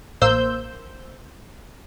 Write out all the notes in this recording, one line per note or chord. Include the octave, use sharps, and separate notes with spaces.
A1 A#3 C5 E6 G6